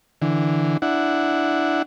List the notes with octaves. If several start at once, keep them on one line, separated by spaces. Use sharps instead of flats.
D3 E3
D4 E4 F#5